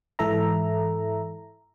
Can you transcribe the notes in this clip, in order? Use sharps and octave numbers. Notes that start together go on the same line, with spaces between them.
G#2 E3 A4 E5 A#5